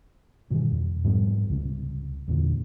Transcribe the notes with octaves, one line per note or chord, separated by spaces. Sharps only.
G2 B2 D#3 E3
F2
G#2 F3 G3 B3
C#2 C3
E2 A#2 D3